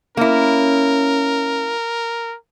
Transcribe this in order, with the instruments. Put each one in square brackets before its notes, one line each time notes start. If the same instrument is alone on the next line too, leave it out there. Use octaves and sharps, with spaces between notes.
[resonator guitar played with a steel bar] A#3 E4 [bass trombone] C#4 [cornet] A#4